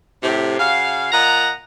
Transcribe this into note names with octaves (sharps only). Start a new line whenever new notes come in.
A2 C3
C#3 F#4 F5
A#2 D#5 F#5 A#5